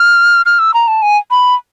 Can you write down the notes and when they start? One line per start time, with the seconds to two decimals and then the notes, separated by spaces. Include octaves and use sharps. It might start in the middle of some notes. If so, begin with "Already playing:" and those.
Already playing: F6
0.46 F6
0.59 E6
0.74 A#5
0.88 A5
1.02 G#5
1.31 B5